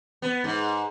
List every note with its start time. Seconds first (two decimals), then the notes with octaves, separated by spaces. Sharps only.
0.22 B3
0.44 G#2